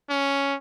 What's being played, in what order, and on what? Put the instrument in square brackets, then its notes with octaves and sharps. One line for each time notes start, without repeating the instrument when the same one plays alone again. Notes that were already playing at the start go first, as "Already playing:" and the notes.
[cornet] C#4